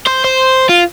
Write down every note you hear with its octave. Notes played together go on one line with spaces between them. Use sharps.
C5
C5
F4